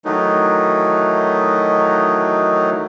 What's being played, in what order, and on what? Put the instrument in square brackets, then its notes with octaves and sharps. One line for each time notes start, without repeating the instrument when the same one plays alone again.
[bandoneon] D#3 E3 F#3 A3 D#4